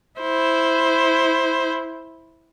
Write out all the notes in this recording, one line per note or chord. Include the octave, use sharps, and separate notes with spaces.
E4 C5